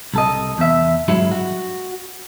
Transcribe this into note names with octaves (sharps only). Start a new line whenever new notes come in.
C2 A4 D#5
E2 E5
G2 F#3 G#3 E4
F#4